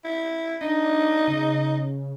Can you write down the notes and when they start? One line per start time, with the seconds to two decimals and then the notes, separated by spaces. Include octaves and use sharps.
0.04 E4
0.61 D4 D#4
1.27 C#3